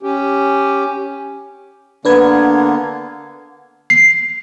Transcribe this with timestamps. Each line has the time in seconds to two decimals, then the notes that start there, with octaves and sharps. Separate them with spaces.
0.03 C#4 G4
2.05 D3 A#3 B3 D4 B4 G#6
3.90 C7